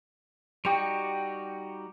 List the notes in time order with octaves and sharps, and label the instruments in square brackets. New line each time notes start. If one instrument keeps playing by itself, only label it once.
[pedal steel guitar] G3 D#4 F#4 [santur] G4 C#6